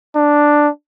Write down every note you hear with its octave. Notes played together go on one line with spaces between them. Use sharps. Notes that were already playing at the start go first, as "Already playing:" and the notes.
D4